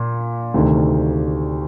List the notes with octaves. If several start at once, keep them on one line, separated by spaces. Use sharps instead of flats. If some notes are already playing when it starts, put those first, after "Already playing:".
Already playing: A#2
D2 C3 D#3